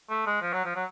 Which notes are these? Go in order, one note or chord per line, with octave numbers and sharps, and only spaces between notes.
A3
G#3
F3
F#3
F3
F#3